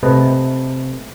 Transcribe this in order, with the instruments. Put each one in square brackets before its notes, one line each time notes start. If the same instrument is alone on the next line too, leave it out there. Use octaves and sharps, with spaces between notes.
[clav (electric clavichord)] C3 A3 B4 D#5 A5